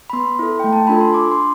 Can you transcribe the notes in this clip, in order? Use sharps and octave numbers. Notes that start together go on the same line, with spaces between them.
B5
B3 C6
E4 A4
A3 G5
A5
D4 F4 A4 B5
C6
D4 D6
C6